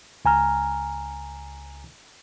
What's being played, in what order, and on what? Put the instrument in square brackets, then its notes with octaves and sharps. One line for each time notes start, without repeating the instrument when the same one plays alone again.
[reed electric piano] C#2 G#5 A#5 F6